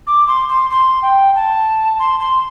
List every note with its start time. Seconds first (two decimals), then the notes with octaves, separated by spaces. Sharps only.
0.07 D6
0.28 C6
0.49 C6
0.70 C6
1.02 G5
1.35 A5
1.99 C6
2.20 C6